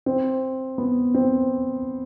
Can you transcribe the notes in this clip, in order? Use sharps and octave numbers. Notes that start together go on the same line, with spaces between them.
C4
B3
C4